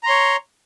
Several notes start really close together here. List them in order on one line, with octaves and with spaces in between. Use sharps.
A#5 C6 C#5